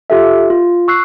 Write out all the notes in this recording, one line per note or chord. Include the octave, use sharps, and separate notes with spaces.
F4 G4 A4 E5
F4
C#6 E6 F#6 C7